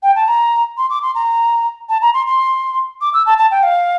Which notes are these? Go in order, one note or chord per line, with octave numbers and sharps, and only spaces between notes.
G5
A5
A#5
C6
D6
C6
A#5
A5
A#5
C6
C6
D6
E6
A5
A5
G5
F5